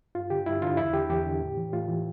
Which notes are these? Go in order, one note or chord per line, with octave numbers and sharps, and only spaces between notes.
G2 F4
D3 G4
G2 E4
D3 F4
E2 E4
D3 G4
E2 G4
D3
A2
E3
A2 F4
E3